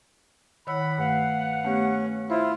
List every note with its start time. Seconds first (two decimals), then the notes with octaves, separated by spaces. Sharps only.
0.67 A2 D#3 C#5 F#5 B5 E6
0.98 G2 A3 B4 F5 F#5
1.65 A3 B3 C#4 G4
2.30 E4 F4 C5